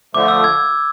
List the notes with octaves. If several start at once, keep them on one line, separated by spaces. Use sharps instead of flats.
D3 F3 A3 D6
E6
G#6